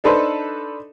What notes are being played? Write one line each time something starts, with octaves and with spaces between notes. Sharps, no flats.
D4 D#4 A4 B4 C5